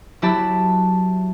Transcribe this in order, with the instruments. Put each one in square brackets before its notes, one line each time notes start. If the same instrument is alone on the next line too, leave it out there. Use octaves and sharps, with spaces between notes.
[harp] F#3 E4 G4 A5 B5